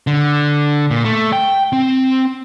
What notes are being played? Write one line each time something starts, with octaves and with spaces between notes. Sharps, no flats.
D3
A#2
A3
G5
C4